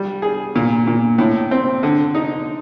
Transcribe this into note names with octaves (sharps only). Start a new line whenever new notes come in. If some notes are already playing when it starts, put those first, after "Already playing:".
Already playing: G3
G#4
A#2
A#2
A2
C4
D3
D#4